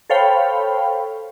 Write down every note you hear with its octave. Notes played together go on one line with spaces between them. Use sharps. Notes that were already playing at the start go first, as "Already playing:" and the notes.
A4 C5 C#5 F5 G5 B5